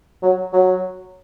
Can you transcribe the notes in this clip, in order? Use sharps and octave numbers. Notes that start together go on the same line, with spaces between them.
F#3
F#3